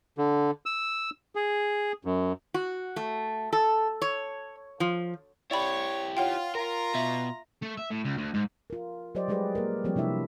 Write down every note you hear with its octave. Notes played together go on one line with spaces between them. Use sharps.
D3
E6
G#4
F#2
F#4
A3
A4
C#5
F3
E4 G4 C#5 D5 G5 B5
F4 C#5 F#5 G5
F4 A#4 A#5
B2 E5
A3
E5
A2
C#2
D2
G#2
F4 A#4
F#3 G4 C5 D5 D#5
G3 G#3 G4 G#4 B4 D5
A#3 A#4
F3 G3 A3 C4 G4 C#5
C3 D4 E4 E5